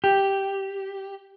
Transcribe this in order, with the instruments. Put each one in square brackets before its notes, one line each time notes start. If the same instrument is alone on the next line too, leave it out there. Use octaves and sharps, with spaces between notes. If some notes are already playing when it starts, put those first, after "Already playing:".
[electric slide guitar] G4